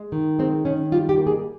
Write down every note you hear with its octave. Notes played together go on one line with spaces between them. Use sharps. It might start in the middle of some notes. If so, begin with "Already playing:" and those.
Already playing: G#3
D#3
G#3 C4
D#3 C#4
G3 F4
G4
A#3
G#4